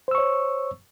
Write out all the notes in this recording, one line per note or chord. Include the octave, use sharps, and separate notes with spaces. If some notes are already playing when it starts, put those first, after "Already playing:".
C5 C#5 C#6 E6